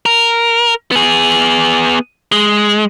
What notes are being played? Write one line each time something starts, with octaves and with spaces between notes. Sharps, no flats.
A#4
B3 G#4
G#3